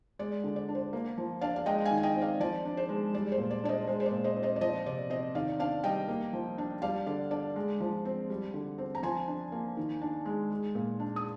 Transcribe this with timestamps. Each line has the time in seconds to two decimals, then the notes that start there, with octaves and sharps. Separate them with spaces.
0.19 G#3 D5
0.44 D3
0.56 D5
0.68 D4
0.75 C5
0.93 A#3
1.18 F3
1.41 D4 D5 F5
1.56 F5
1.66 G#3 D#5 G5
1.85 F5 G#5
1.91 D#3
1.97 G#5
2.03 D#5 G5
2.15 C4
2.21 D5 F5
2.40 F3 D5
2.65 D4
2.77 C5
2.89 G#3
3.14 G3 D5
3.32 C5
3.38 A#2
3.51 D5
3.64 D4 D5
3.69 C5 D#5
3.87 G#3 C5
4.00 C5
4.06 D5
4.12 A#2
4.24 C5 D#5
4.37 C4
4.43 C5 D#5
4.56 D5
4.61 F3 C5 D#5
4.86 C3 D5
5.10 C4 C5 D#5
5.35 D#3 D5 F5
5.59 D4 D5 F5
5.84 G3 D#5 G5
6.08 A#3
6.33 F3
6.58 D4
6.82 G3 D5 F5
7.06 D3 D5
7.31 D4 D5
7.56 G#3
7.80 F3
8.05 C4
8.30 G3
8.54 D3
8.78 C4
8.95 A#5
9.03 F3 G#5 C6
9.28 D4
9.52 A#3
9.77 D#3
10.01 D4
10.26 G#3
10.50 G#3
10.75 A#2
11.00 D4
11.16 D#6